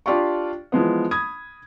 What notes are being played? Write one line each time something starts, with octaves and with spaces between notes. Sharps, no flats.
D4 F4 G4 D5 F5 C#6
E3 F3 G#3 B3
B5 D#6 G#6